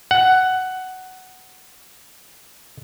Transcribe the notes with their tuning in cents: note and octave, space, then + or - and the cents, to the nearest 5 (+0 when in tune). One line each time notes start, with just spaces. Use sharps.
F#5 +10